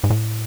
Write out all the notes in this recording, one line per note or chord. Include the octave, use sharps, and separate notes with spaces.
G#2
A2